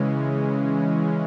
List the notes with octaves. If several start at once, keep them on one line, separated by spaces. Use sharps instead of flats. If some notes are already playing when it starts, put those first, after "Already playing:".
Already playing: C#3 E3 G#3 C#4